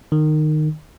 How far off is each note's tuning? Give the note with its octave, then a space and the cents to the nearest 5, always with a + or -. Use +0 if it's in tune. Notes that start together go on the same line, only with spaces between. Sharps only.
D#3 -20